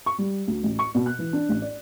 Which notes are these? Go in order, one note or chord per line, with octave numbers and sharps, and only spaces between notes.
C#6
G3
D2
A1
C#6
B2
F#6
E3
D4
A1
D5